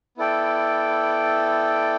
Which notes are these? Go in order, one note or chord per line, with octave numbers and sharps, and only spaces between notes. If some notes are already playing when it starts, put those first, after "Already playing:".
B3 E4 A4 D5 G5